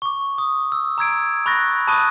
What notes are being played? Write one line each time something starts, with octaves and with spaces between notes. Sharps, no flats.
C#6 D6
D#6
E6
A#5 E6 G#6 D7
B5 C#6 F#6 A6 A#6
A5 B5 C#6 D#6 F#6 D#7